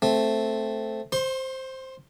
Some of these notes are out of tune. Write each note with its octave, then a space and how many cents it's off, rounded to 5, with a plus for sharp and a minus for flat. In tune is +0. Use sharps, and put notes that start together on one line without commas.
A3 +0 C4 +0
C5 +5 C6 +40